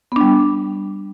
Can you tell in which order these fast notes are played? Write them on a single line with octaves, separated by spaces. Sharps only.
B3 D4 G3